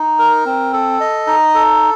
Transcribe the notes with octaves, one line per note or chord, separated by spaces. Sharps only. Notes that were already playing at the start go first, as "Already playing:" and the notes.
Already playing: D#4
A#4
C4
A4
D#5
D#4
A4